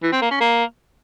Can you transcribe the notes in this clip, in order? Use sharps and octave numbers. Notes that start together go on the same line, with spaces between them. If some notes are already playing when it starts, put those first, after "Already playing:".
E3
C4
A#3
C#4
A#3